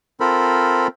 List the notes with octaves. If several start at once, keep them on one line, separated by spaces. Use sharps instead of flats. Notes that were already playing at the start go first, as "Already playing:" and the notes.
C4 F4 A4 A#4 C5 B5